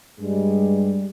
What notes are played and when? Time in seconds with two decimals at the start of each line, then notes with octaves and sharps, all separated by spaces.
0.19 G2 G3 G#3